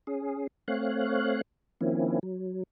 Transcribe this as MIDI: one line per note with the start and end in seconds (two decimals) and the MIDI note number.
0.07 0.47 61
0.07 0.47 68
0.68 1.41 57
0.68 1.41 60
0.68 1.41 73
0.68 1.41 77
0.68 1.41 90
1.81 2.19 51
1.81 2.19 53
1.81 2.19 58
1.81 2.19 60
1.81 2.19 61
1.81 2.19 64
2.23 2.63 54